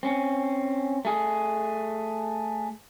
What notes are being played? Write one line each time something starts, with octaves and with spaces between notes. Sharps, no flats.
C4 C#4
A3 G#4